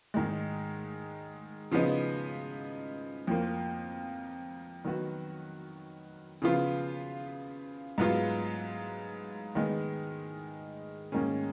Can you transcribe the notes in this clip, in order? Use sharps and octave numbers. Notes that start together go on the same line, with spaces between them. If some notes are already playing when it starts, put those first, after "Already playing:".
G#2 D#3 G#3
C#3 F3 B3 D#4
F2 F3 A#3
D#3 F#3 B3 F#4
C#3 F3 B3 F4
G#2 F#3 B3 F4
D#3 G#3 B3
G#2 D#3 A#3 C#4